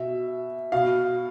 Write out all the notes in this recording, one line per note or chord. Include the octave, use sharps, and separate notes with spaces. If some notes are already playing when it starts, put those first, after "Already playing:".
Already playing: B2 E5
B2 F5